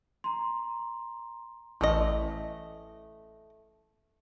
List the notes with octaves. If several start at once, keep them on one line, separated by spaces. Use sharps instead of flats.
A#5 C6
A1 A3 D#5